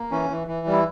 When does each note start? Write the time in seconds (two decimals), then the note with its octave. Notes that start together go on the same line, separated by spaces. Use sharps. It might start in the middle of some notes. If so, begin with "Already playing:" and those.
Already playing: A#3
0.11 E3 C#4
0.30 E3
0.47 E3
0.67 G3
0.73 E4